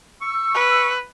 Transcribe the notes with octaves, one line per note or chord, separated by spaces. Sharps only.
C#6 E6
B4